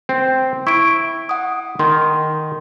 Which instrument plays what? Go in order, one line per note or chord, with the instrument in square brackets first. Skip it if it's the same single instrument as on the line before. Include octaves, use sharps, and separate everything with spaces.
[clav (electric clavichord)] C4
[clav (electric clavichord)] E4 [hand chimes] C#6 D7
[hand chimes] F#5 D#6
[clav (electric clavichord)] D#3 [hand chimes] C6